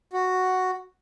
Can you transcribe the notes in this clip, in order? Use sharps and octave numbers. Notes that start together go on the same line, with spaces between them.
F#4